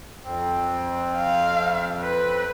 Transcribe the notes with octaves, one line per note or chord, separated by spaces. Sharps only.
F2 C4
F5
B4